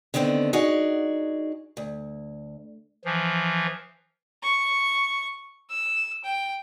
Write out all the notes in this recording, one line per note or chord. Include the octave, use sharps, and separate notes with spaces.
D3 D#3 B3 C4 D4
D#4 F#4 G#4 D5
D2
E3 F3
C#6
E6
G5